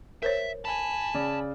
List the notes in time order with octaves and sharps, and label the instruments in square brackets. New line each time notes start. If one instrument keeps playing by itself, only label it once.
[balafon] A#4 C5 C#5 [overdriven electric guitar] E5
[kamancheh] G#5 B5 [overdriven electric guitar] A5
[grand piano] C#3 D5